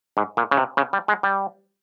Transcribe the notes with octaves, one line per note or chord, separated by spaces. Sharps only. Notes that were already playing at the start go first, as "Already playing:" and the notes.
G#2
A#2
C#3
C3
C#3
G3
G#3
G3